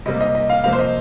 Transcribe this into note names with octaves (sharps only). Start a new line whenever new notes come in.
C3 G3 A#3 D#5
D#5
D#5
F5
C3 F3 A#3 F5
C5
D#5